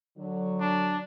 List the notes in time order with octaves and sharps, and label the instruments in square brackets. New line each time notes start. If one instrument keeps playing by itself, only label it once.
[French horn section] D3 F#3
[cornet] D4